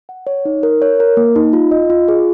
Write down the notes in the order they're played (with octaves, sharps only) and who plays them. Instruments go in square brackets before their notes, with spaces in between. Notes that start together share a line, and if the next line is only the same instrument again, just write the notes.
[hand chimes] F#5
C#5
D#4
A#4
C#5
A#4
A#3
D#4
F4
D#5
F4
G#4